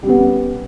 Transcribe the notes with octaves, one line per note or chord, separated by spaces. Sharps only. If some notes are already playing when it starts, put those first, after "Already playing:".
G3 B3 C#4